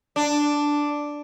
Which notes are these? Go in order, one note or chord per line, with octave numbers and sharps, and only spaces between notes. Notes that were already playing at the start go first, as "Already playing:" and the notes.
D4